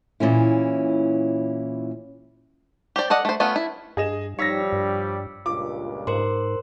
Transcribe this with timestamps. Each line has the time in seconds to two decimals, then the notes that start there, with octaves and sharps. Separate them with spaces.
0.20 A#2 E3 C#4 E4
2.96 G4 C5 D5
3.10 A4 D5 D#5 F#5
3.25 A3 C5
3.40 A3 B3 C#4 F4 B4
3.56 E4
3.97 G2 G#4 D#5 E7
4.39 F3 G3 D#4 C#5 E6 A#6 B6 C#7
4.72 G2
5.46 C#2 G2 A#2 F4 D6
6.07 G#2 A#4 C5 C6